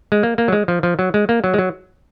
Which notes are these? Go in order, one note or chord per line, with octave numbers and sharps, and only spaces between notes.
G#3
A#3
A#3
F#3
G#3
F3
F3
F#3
G#3
A#3
F#3
G#3
F#3